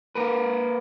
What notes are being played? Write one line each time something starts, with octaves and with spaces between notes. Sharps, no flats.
A#3 A#4 B4